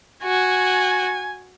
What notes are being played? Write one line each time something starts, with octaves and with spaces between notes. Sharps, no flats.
F#4 G#5